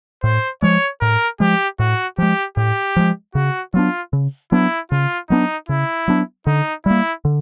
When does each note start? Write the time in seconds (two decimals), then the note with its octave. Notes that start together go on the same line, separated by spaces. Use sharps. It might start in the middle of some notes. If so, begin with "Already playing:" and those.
0.23 A2 C5
0.62 F3 G#3 C#5
1.01 A2 A#4
1.40 F3 G#3 G4
1.79 A2 F#4
2.18 F3 G#3 G4
2.57 A2 G4
2.96 F3 G#3
3.35 C#3 F#4
3.74 F#3 B3 D4 F4
4.13 C#3
4.52 F#3 B3 D4 E4
4.92 C#3 F4
5.30 F#3 B3 D4 D#4
5.69 C#3 E4
6.08 F#3 B3 D4
6.47 D3 D#4
6.86 G3 A#3 E4
7.25 D3